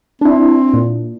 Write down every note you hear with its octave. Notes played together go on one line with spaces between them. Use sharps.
C4 D4 E4
A#2